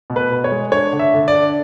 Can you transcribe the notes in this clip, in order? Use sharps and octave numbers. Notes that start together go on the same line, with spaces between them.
B2
B4
B2
C#5
G#3
D4 C#5
D3
E5
D3
D5
D4